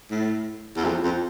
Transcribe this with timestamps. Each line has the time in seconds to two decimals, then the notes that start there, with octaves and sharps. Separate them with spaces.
0.11 A2
0.77 E2
0.85 F2
1.04 F2